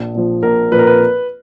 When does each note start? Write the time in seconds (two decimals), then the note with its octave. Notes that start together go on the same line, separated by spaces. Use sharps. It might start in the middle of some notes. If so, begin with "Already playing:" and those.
Already playing: A#1
0.15 A#2 F3
0.43 A#1 A#4
0.72 A#2 F3 B4
0.79 A#4
0.87 B4